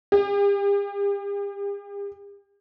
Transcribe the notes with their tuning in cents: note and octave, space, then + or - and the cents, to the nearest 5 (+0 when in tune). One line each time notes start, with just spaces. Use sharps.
G4 +40